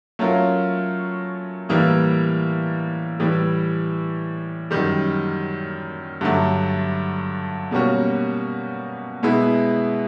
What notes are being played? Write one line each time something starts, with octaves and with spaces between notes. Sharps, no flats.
F#3 A3 C#4 F4 A#4
A2 E3 G3 A#3
A2 E3 G3
F#2 D#3 G3
G2 D3 F#3 A3
B2 G3 A#3 C#4 F#4
B2 G#3 B3 E4